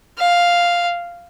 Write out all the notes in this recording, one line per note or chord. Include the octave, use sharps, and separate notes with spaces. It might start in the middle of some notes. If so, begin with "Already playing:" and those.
F5